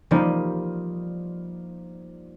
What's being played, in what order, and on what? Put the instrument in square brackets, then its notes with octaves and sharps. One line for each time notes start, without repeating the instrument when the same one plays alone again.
[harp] F3 G3 A#3 D#4